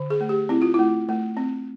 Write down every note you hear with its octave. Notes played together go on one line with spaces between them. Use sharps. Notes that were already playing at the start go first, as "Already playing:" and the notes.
Already playing: D3
G#4
A3
G4
C4 E4
F4
A3 E4
A3
C4